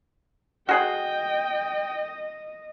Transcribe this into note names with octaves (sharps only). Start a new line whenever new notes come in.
F#4 G#4 D#5 F#5 G5